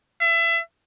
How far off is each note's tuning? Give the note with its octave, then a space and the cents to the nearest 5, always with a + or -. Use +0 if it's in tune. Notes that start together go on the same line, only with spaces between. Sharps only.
E5 +25